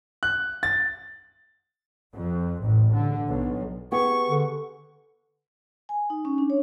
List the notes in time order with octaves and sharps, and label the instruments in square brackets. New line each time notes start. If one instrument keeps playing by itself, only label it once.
[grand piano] F#6
A6
[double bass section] F2
A1
D3
B1
[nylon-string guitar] B3 G4 G#4 [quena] C#6
[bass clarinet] D3
[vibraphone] G#5
D#4
C#4
D4
C#5